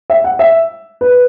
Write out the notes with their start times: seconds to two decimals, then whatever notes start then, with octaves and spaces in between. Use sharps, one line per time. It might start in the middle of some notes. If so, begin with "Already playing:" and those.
0.10 E5
0.24 F#5
0.39 E5
1.01 B4